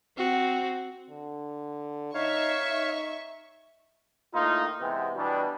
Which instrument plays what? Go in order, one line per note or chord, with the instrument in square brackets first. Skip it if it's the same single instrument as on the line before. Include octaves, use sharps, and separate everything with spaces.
[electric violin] C4 F#4
[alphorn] D3
[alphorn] D#4 [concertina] C#5 F5 [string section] E5 C#6
[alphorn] D#4
[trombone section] A2 A#3 D#4 F4
C3 E3 G#3 B3
B2 E3 G3 B3 D4